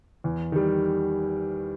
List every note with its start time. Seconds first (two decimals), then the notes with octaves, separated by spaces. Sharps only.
0.24 E2
0.52 D#3 G3